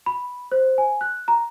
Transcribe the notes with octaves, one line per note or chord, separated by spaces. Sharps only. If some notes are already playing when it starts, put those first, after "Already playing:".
B5
C5
G#5
F#6
A#5